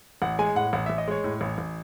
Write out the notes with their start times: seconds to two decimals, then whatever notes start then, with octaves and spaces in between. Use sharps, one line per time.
0.22 A1 F#5
0.39 G#3 G#5
0.55 A2 F#5
0.73 A1 F#5
0.86 A1 E5
0.98 D#5
1.08 G#3 C#5
1.24 A2
1.41 A1
1.58 A1